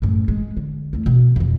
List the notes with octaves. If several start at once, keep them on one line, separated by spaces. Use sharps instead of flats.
F#2 A2
G#3
D3
E2 A3
B2
F2 D#3